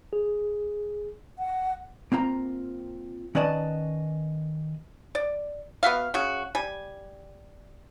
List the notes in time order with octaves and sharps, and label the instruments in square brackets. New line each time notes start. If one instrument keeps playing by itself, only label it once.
[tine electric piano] G#4
[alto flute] F#5
[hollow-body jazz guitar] A#3 C4 F4 A#5
D#3 C#4 B4 D5 D#5 A5
[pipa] D5
B3 F#4 E5 F5
C#3 F#4
G3 G#5